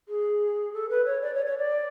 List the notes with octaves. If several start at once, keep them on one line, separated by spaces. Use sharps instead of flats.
G#4
A4
B4
C#5
D5
C#5
C#5
D5